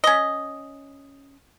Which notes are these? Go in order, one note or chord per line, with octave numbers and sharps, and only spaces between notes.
C#4 D#5